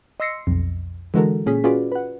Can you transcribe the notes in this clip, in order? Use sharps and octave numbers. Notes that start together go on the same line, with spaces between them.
D#5 C6 E6 A#6 C7 C#7
B1 F2
D3 E3 G#3 F#4 A4 A#4
A#2 C#4 G#4 B6
C#4 F4 F#4 G#4 B4 D5
B4 F#5